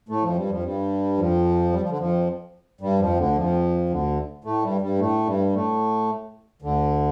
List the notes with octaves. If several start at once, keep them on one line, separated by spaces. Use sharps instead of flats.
A2 A3
F2 F3
G2 G3
F2 F3
G2 G3
F2 F3
G3
F3
D3
F2 F3
G2 G3
F2 F3
D2 D3
F2 F3
D2 D3
A2 A3
G2 G3
G2 G3
A2 A3
G2 G3
A2 A3
D2 D3